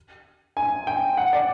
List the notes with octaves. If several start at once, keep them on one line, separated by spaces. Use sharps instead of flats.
G#5
G5
F#5
D5